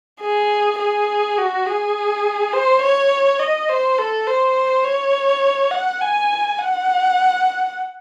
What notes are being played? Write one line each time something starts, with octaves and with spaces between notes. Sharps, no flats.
G#4
G#4
F#4
G#4
C5
C#5
D#5
C5
A4
C5
C#5
F#5
G#5
F#5